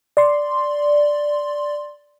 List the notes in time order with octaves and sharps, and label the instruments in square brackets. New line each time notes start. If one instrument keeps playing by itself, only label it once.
[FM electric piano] D5 C6